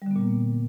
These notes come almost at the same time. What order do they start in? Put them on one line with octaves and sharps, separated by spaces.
G3 D3 B3 A#2 A#3